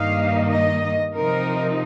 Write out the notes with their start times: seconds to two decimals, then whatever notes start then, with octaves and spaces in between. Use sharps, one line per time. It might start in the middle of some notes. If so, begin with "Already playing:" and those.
Already playing: G2 D#3 A#3 D#4 F5
0.52 D#5
1.15 C3 F3 C4 D#4 A#4